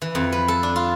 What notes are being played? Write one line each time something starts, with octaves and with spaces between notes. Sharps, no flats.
E3
F2
B4
A4
D4
F4